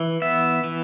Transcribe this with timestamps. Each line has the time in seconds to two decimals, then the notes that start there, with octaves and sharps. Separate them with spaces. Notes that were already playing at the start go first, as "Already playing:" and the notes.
Already playing: E3
0.22 B3 E5
0.64 E3